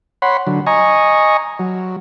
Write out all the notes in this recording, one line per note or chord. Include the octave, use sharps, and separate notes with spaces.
C#5 F#5 B5 C6
D3 F#3
D#5 G#5 A#5 C#6
F#3